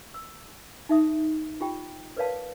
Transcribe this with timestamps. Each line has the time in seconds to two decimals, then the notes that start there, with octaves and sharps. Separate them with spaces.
0.14 E6
0.89 D#4 E5 D#6
1.61 F4 G4 G5
2.17 A#4 B4 C#5 D5 F5 A5